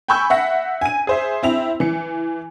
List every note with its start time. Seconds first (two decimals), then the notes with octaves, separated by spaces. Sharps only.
0.08 G5 G#5 B5 C#6 E6 G6
0.30 E5 F#5 A#6 B6
0.81 G#5 D#7
1.07 G#4 C5 E5
1.43 C4 E4 F7
1.80 E3 C#7